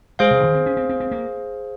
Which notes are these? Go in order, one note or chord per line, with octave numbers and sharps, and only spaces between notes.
G#3 G#4 C5 F5
C3
D#3
C4
C#4
C4
C4
C4
A#3